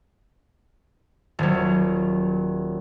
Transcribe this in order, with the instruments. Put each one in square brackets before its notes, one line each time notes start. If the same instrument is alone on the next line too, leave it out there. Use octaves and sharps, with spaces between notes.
[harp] D#1 F#3